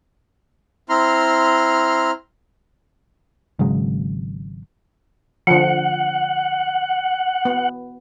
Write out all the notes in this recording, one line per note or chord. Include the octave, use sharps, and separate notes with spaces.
C4 E4 A#5 C6 F6
G#1 C#3 F#3 G#3
D3 F3 F#5
B3